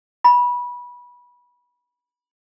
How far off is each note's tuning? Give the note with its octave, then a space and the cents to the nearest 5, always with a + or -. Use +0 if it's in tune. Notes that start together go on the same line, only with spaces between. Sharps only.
B5 -20